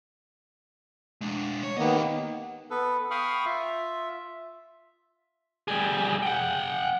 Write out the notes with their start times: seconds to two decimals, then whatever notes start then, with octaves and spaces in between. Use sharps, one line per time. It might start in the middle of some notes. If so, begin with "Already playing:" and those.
1.21 G#3 D4
1.63 C#5
1.78 D#3 A#3 B3 G4 D#5
2.70 B3 A4 B4
3.11 F5 G5 B5 C#6 D#6 F6
3.46 F4 E5
5.68 G3 G#4
6.23 F#5 G5